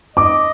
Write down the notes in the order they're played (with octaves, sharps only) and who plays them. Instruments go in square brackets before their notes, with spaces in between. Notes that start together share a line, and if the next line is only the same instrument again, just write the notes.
[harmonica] D#5 [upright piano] D6